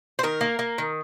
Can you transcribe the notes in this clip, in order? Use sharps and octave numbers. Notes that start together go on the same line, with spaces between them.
C5
D#3 A#4
A#3
A#3
D#3